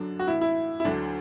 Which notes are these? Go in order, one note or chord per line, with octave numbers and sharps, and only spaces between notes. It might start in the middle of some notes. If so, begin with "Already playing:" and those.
Already playing: F#2 D3 F#3 D4
F#4
A2 E3 E4
E4
E4
D2 D3 F#3 D4